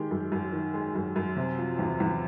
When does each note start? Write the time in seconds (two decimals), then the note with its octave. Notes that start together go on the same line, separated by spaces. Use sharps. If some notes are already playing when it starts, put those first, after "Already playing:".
Already playing: D#3 G#3 G4
0.11 F#2
0.32 F#2
0.52 D#3
0.74 G#3
0.95 F#2
1.16 F#2
1.36 C3
1.58 F3
1.79 E2
2.00 E2